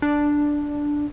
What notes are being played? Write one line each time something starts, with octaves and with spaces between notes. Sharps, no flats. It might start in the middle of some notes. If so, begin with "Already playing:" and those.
D4